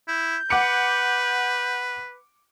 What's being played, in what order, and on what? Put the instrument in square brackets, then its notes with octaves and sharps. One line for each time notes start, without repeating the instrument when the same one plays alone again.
[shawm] E4 [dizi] G6
[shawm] B4 [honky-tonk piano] F#5 D6 C#7